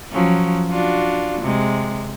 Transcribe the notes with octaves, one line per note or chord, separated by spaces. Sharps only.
F3 F#3 C#4
D4 F4 F#4
C3 G#3